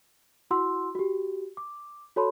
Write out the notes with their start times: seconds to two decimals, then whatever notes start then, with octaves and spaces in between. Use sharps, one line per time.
0.51 E4 F#4 F#5 C6 E6
0.95 F#4 G4
1.57 D6
2.16 F#4 A4 C#5 A5 B5 C6